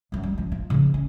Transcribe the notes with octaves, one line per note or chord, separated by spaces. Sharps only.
A1 F#2
G3
F3 D4
F4
C#3 F3
C#4